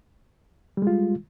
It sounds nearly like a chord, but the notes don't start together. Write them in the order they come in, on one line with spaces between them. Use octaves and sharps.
G3 G#3 F4